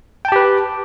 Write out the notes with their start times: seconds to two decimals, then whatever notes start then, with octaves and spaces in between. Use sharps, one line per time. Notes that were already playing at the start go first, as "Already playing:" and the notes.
0.25 G5
0.28 A5
0.32 G4
0.36 B4